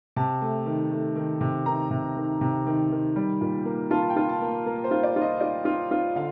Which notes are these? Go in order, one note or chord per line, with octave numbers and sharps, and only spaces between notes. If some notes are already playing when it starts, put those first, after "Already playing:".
C3 A5
A3
D#3
A3
D#3
C3
D#3 A#5
C3
D#3
C3
D#3
D#3
G3
A#2
A#3
F4 A5
G5
F4
A5
A#3
A#3
C5
F4
D5
F4
D#5
F4 D5
F4
F4
D3 F5